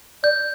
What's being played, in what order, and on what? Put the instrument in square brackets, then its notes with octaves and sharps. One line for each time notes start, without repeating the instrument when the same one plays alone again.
[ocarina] D5 [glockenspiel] G6